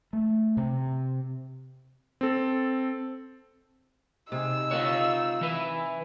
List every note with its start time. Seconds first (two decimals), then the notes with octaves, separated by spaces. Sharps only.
0.13 A3
0.57 C3
2.21 C4 A4
4.32 C3 D#4 G#4 E6
4.71 D#3 F4 C#5 F#5
5.41 E3 B4